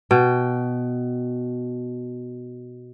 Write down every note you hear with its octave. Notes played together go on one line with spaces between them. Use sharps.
B2 G5